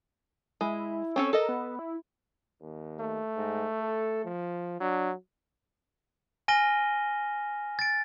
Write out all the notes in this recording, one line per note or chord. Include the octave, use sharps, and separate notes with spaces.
G#3 E4
C4 C#4 A4 C#5
A4 A#4 D#5
B3
E4
D#2
A3
G#2
A4
F3
F#3 D4
G#5 F6 A#6 D#7 G7
A6 D7